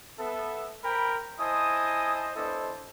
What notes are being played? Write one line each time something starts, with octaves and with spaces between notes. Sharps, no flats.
B3 A4 E5
A#4 C5 G5 B5
E4 C5 D#5 G#5 A5 D#6
B3 D4 E4 A4 C5 D#5